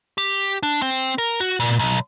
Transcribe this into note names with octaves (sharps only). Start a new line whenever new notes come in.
G4
D4
C4
A#4
F#4
A#2
B1